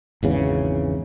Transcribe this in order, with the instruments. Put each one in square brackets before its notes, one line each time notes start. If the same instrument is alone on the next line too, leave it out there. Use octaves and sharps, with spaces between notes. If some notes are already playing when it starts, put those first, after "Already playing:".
[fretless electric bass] G#1 E2 C#3